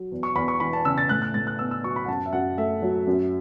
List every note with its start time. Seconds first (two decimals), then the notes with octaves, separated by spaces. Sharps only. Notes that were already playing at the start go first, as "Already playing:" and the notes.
Already playing: F#3
0.12 E2
0.23 C#6
0.36 E2 B5
0.48 C#6
0.60 E3 B5
0.73 A5
0.85 C#3 E6
0.98 A6
1.09 A2 F#6
1.22 F#6
1.34 A2 A6
1.47 F#6
1.59 B3 E6
1.71 E6
1.83 F#3 C#6
1.96 B5
2.05 F#5
2.08 F#2 A5
2.26 E5
2.33 F#2 F#5
2.58 A3 E5
2.82 F#3
3.07 F#2